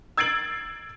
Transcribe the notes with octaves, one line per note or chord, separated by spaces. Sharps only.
E6 G#6 A6 C7 D7 F#7